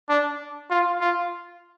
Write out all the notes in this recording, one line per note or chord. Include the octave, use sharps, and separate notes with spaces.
D4
F4
F4